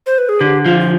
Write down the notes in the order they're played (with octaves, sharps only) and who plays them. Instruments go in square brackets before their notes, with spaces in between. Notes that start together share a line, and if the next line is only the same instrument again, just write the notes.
[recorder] C5
B4
G#4
[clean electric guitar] D3 [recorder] G4
[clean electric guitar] F3 [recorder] F4
[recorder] F4